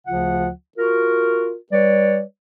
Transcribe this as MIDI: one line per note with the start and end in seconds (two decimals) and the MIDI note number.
0.07 0.50 38
0.07 0.50 49
0.07 0.50 53
0.07 0.50 65
0.07 0.50 78
0.78 1.55 65
0.78 1.55 66
0.78 1.55 70
1.72 2.23 55
1.72 2.23 71
1.72 2.23 73
1.72 2.23 74